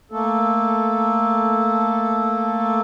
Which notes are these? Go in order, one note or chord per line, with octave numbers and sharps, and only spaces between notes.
A3 A#3 A4